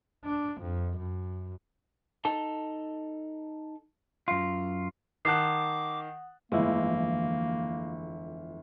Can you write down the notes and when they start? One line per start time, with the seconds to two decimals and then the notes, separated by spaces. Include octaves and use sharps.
0.25 D4
0.62 F2
0.98 F#2
2.25 D#4 A4 A5
4.28 F#2 F4
5.25 D#3 F#5 A5 D6 D#6 F#6 C7
6.52 G1 F2 D3 E3 G#3 A#3 E4